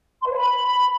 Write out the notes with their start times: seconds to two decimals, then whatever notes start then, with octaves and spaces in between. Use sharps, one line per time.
0.21 C6
0.26 B4
0.31 C#5
0.37 B5